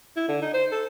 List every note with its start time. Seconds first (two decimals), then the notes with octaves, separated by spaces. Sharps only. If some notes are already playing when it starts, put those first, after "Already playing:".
0.16 E4
0.28 D3
0.42 D#4
0.54 C5
0.72 A4